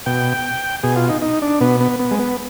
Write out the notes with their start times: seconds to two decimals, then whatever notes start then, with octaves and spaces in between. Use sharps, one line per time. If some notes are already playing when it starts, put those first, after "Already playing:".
0.06 B2 G5
0.83 B2 G#4
0.96 F4
1.09 D#4
1.22 D#4
1.42 D4
1.61 B2 B3
1.80 B3
2.00 B3
2.11 G#3
2.19 B3